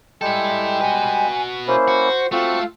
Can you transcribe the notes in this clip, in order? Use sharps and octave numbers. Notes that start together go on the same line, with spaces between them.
G3 G#3 E4 A4 G5
F#4 B4 G#5
A#3 C#4 E4 C5
F#4
A3 C4 F4 F#4 A4